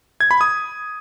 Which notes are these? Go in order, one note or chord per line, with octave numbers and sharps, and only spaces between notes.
G#6
B5
D#6